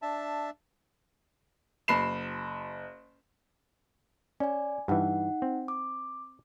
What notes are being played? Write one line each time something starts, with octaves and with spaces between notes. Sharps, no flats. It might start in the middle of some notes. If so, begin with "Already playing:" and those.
D4 E5 A5
F#1 B5 C7 E7
C#4 D5 G#5
G2 E3 D#4 F#5
C4
D6